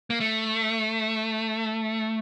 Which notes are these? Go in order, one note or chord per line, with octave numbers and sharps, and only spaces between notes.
A#3
A3